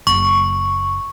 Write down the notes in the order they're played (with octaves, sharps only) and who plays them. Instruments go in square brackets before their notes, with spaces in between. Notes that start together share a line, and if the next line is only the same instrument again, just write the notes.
[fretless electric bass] F#1 [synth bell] C#6